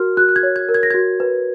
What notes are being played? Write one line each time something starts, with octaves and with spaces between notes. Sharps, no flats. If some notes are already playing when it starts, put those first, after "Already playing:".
Already playing: F#4 A#4 F6
F#4 F#6
F#6
G#6
C#5
G#6
A#4
G#6
A#6
F#4 G#6
B4